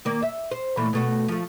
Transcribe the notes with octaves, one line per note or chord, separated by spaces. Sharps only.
D#3 A#3 D5
E5
C5
A#2 E3 A3
B2 A3 F#4
F3 A3